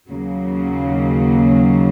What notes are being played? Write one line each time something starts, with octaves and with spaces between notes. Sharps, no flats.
D#2 C#3 F#3 A#3